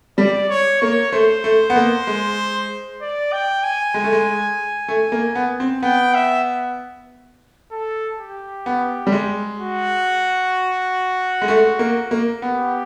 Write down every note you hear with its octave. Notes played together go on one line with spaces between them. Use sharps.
G3 D5
C#5
A#3 C#5
A3 C5
A3
B3
A#3
G#3
D5
G5
G#5
G#3
A3
G#3
A3
A#3
B3
C4
B3 G5
E5
A4
G4
B3
G3
G#3
F#4
G#3
A3
A#3
A#3
B3 G4